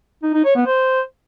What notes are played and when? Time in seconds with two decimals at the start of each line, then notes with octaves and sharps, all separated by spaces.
0.23 D#4
0.34 D#4
0.45 C#5
0.56 B3
0.66 C5